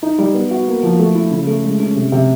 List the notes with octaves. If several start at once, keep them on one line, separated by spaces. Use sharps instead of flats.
D#4
G3
B3
F#4
A#3
F3
A3
E4
C#3
A3
G#3
C#4
C3
C3